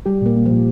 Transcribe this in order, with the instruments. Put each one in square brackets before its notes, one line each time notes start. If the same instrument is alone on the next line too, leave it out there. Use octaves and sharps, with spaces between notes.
[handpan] G3 [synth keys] G4
[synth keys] A#2 [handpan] A#3
[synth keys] A#3
[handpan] F3
[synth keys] A#2